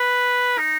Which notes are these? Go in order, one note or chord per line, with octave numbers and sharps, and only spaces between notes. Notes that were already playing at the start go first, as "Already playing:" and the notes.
Already playing: B4
D#4